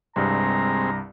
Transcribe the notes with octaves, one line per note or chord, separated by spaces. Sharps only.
C2 G2 G#3 C4 A#5